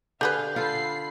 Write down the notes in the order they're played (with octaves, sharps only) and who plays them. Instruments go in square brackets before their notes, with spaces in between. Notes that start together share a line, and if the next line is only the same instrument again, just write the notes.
[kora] D3 [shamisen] G4 G#4 B4 [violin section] F5 [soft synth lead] G6
[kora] F4 A4 [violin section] B5 C7